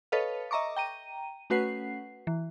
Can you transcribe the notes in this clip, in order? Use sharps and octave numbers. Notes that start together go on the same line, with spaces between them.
A4 B4 C#5 D#5 F5
D#5 E5 A#5 C#6 D6
G5 A#5 D#7
A3 C#4 F#4 B4 F#5 C7
E3